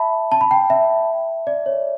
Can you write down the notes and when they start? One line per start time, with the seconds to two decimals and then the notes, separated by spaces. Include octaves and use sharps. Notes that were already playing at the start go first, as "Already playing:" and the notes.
Already playing: E5 A5 B5
0.32 A5
0.41 B5
0.51 G5
0.70 E5
1.47 D5
1.66 C#5